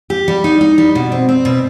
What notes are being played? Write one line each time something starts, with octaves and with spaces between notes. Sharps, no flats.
G4
G3
D#4
D#4
G3
B2
C4
C4
B2